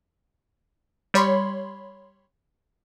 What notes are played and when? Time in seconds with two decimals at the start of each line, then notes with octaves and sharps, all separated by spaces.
1.14 G3 C#5 B5 C6